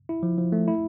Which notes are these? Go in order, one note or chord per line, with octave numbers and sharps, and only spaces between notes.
E4
F3
F3
A3
E4